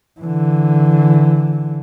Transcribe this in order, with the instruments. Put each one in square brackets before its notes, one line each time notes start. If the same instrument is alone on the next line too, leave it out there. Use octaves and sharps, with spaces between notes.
[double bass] D3 E3